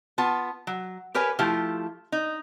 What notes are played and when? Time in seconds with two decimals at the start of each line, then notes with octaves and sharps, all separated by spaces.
0.18 B3 F4 A5
0.67 F#3
1.14 G4 A#4 B4 C#5 G#5
1.39 F3 A3 E4 F4 G4
2.12 D#4